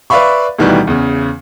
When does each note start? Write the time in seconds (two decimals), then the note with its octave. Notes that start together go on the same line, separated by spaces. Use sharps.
0.10 B4 D5 E5 F5 B5 C#6
0.59 D2 B2 D#3 E3 G3
0.87 E2 C#3